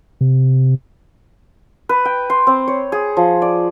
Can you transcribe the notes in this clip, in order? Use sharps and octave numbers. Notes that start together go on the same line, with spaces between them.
C3
B4
G5
C6
C4
C#5
G#4
F3
D5